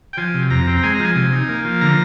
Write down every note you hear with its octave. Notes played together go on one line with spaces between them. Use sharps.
G5
F3 G#5
C3
F2 A#5
C4
A#5
G#3 G#5
A#5
F3
G#5
C3 G#5
D#4
A#3
F3
D3 A#5